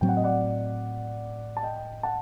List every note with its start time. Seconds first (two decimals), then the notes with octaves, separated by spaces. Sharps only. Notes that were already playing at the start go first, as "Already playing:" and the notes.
0.01 A2 F#3 C4 G5
0.09 F#5
0.17 D#5
0.24 D5 F#5
1.57 A5
1.63 D#5 G5
2.03 F#5 A5